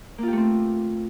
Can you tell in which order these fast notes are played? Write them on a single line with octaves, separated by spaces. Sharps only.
A#3 F4 G4 A3 C4